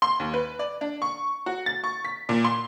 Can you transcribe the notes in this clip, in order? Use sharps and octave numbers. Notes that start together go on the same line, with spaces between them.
C6
D#2
B4
D5
D4
C#6
F#4
A6
C#6
B6
A#2
C6